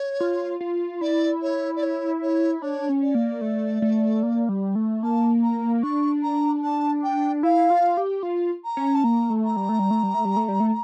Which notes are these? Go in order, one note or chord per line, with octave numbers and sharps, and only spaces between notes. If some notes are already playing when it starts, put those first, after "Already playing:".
Already playing: C#5
F4
F4
E4 D5
C#5
D5
C#5
C#5
D4 C#5
C#4
D5
A#3
A3
A3
A#3
G3
A3
A#3 A5
A#5
D4 C#6
A#5
A5
G5
E4 F5
F4
G4
F4
A#5
C#4
A5
A#3 A#5
A3
A#5
G3
A3
G3
A3
G3
A3
G3
A3
G3
A3